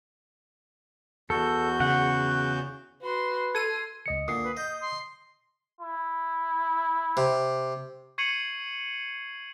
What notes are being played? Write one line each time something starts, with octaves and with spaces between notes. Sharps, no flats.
E2 F#4 A4 G6
C#3 F#5
F#4 B4 C6
A4 C6 G#6 D#7
C#2 D#5 C#7
A#2 D3 D#6 C7
B4
D#5 G6
C6
E4
C3
C#6 G#6 C7 C#7 D#7 F#7